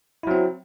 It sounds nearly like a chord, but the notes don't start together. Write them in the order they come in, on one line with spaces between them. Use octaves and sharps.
E4 F#3 C4